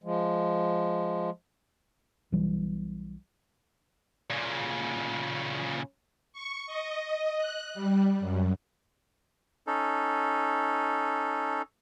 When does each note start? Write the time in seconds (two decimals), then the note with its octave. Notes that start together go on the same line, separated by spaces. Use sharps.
0.04 F3 G#3
2.32 B1 B2 E3 G3
4.30 A#2 C#3
6.33 C#6
6.67 D#5
7.38 F#6
7.74 G3
8.20 F#2
9.67 C#4 D#4 A4